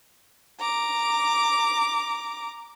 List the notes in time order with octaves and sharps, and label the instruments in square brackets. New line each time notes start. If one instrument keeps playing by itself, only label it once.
[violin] A#5 D6